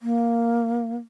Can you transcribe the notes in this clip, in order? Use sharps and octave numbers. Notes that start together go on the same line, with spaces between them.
A#3